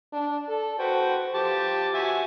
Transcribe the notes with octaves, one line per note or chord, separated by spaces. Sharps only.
D4
A4
F#4 B4 C5 G5
F3 G4 A5
F#4 E5 G#5